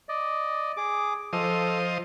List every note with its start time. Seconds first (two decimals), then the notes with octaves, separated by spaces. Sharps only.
0.09 D5 D#5
0.77 G#4 D6
1.33 F3 A4 C5 D#5